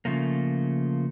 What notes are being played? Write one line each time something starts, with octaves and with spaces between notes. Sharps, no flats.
C#3 F3 A3 A#3